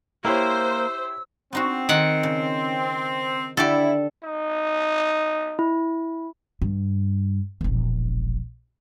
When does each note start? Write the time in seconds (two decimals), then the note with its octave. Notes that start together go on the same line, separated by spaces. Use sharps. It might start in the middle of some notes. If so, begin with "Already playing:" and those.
0.25 A#3 E4 G4 C5 C#5 E6
1.53 B3 C4 D#4 F#4
1.89 D#3 F#5
2.23 C#3
3.57 D3 E4 G4 A4 D5
4.23 D#4
5.59 E4
6.62 G2
7.61 E1 A#1